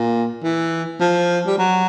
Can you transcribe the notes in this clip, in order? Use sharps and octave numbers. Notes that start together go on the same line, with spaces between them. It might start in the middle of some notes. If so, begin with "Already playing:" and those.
Already playing: A#2
E3
F3
G3
F#3